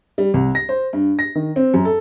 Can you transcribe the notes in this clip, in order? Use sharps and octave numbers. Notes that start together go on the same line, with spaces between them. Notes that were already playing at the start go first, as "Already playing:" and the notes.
G3
C2
A#6
C5
G2
A#6
D#3
C4
F#2
A4